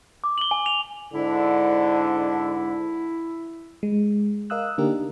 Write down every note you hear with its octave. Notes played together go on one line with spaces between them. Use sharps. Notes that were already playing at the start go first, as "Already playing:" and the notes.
D6
F#7 G7
G#5
F7
G#2 D3 E4
G#3
A#4 D#5 F5 D#6 E6 F#6
D3 A#3 D4 D#4 G4 A#4